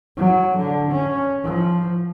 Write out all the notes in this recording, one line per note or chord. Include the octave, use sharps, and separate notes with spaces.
F#3
D3
C#4
F3